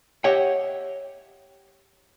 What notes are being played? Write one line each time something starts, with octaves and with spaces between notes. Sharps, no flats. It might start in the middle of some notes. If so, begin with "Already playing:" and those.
G4 C#5 D#5 E5 F#5 G5